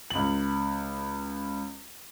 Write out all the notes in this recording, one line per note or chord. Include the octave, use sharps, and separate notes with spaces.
C#2 F#7